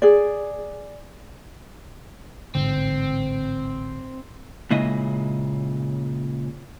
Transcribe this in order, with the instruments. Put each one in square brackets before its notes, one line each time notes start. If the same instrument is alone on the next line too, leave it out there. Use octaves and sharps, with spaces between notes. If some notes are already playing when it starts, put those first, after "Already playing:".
[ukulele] G#4 D5
[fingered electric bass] A1 G#2 D3 [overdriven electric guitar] C4
[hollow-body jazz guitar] A#2 C#3 G#3 E4 D#5